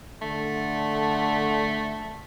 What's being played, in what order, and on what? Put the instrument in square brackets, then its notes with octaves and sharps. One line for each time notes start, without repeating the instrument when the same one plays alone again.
[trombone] D3 [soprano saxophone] A3